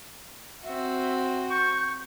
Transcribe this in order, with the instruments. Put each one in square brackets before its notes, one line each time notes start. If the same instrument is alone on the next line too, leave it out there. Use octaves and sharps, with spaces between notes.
[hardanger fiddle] C4 F#4 [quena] E5
[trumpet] C#6 [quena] G6